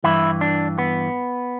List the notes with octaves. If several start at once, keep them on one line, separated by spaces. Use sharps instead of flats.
G2 E3 E4
D4
B3